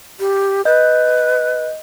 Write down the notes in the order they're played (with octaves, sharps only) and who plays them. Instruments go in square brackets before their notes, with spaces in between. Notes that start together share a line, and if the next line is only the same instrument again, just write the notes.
[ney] G4
[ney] B4 [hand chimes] D#5 G6